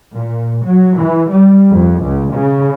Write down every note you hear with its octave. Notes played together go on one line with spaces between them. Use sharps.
A#2
F#3
E3
G3
F2
C#2
C#3